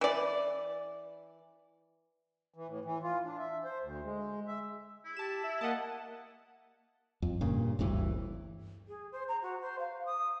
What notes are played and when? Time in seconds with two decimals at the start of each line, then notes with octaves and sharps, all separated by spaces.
0.01 E3 D5
2.54 E3
2.67 A2
2.85 E3
3.03 F4
3.25 D4
3.38 E5
3.64 C5
3.82 D2
4.04 G#3
4.48 E5
5.04 E4
5.17 G4 A5 E7
5.44 E5
5.61 A#3 D#5 F#5 A5
7.22 F2
7.41 G2 A#2 C#3
7.79 G1 D2 G2 E3
8.88 G#4
9.12 C5
9.28 A#5
9.42 F#4
9.62 C5
9.79 F5
10.05 D#6